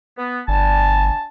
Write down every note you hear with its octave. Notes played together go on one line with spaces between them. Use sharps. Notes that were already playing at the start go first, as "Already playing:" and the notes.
B3
G1 D4 G#5 A5